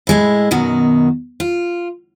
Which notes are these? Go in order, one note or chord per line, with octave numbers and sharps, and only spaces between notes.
A2 G#3 E4
F#2 B2 D#3 F#4
F4